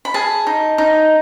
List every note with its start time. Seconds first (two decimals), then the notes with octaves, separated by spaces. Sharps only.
0.05 B5
0.14 G#4 A5
0.47 D#4
0.78 D#4